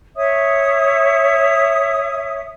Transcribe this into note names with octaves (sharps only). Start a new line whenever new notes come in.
C#5 E5 D#6